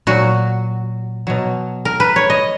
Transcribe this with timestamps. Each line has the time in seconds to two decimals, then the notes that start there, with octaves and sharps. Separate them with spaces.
0.07 A#2 F#3 F#4
1.27 B2 F#3
1.85 A#4
2.00 B4
2.16 C#5
2.30 D#5